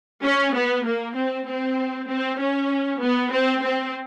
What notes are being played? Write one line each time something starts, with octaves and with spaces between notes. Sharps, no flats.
C#4
B3
A#3
C4
C4
C4
C#4
B3
C4
C4